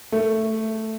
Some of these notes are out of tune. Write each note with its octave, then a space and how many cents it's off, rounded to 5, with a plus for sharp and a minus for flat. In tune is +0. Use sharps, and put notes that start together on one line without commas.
A3 +5